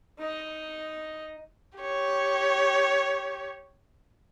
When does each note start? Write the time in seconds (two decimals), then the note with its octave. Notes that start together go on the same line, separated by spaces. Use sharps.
0.19 D#4 D#5
1.78 G4 C#5